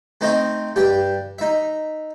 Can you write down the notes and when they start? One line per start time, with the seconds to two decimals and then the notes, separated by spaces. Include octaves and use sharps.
0.21 A3 C4 D#4 D#5 G5
0.76 G2 G4 G5
1.39 D#4 E5